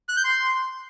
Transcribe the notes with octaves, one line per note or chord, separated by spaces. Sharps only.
F#6
G6
C6